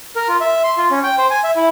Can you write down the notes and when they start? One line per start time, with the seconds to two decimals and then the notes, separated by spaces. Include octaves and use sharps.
0.16 A#4
0.28 F4
0.41 E5
0.64 C6
0.78 F4
0.91 C#4
1.04 G5
1.18 C5
1.30 G#5
1.44 E5
1.56 E4